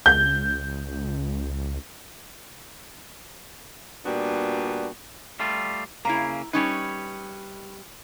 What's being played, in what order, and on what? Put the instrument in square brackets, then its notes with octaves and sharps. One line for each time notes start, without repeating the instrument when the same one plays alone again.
[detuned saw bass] C#2 [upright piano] G6
[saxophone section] A#2 G3 B3 D4 F#4
[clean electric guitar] G3 A3 F4
[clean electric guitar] C#3 A#3 [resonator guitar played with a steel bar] E4 A#5
[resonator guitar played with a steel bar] G3 C#4 D#4 [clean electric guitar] B4 C#5